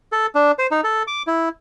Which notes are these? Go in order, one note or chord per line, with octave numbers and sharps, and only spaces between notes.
A4
D4
C5
D#4
A4
D6
E4